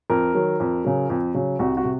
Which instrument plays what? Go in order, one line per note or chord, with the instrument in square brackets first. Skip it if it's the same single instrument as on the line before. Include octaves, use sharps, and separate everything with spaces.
[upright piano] F2 A#4
D#3 F#3
F2
C#3 F#3
F2
C#3 F#3
C2 F#4
F#4
C3